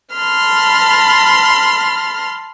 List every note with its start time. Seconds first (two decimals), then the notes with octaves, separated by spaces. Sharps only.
0.15 A5 B5 C6 F6